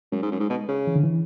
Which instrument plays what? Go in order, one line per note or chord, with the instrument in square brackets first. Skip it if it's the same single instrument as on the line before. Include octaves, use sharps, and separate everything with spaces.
[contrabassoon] F#2 [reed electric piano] G#3
[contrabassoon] G#2
F#2
G#2
B2
C#3
[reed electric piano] E3
D3
E3